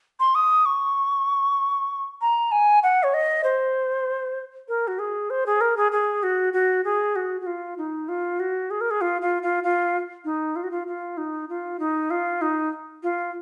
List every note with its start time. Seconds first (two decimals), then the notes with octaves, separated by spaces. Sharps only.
0.20 C6
0.35 D#6
0.65 C#6
2.21 A#5
2.51 G#5
2.83 F#5
3.03 C#5
3.14 D#5
3.44 C5
4.68 A#4
4.87 F#4
4.99 G#4
5.30 C5
5.46 G#4
5.61 A#4
5.77 G#4
5.92 G#4
6.23 F#4
6.53 F#4
6.84 G#4
7.16 F#4
7.41 F#4
7.46 F4
7.78 D#4
8.08 F4
8.40 F#4
8.70 G#4
8.81 A#4
8.90 G#4
9.01 F4
9.21 F4
9.42 F4
9.63 F4
10.24 D#4
10.56 F4
10.63 F#4
10.71 F4
10.87 F4
11.17 D#4
11.49 F4
11.79 D#4
12.10 F4
12.41 D#4
13.03 F4